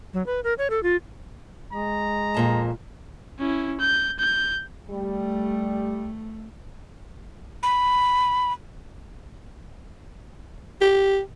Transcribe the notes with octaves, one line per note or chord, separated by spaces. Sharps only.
F#3
B4
A#4
C#5
A4
F4
G#3 A#5
F2 A#2 A5
C#4 E4
G6
G6
G3 A3
B5
G4